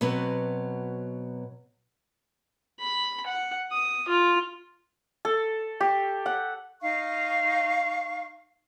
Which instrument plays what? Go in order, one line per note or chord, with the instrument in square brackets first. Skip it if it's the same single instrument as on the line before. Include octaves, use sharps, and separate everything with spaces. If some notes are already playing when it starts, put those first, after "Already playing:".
[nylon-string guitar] B2 F#3 B3 C4
[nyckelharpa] B5
F#5
D#6
F4
[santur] A4
G4
F#5
[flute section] D#4 F5 C#6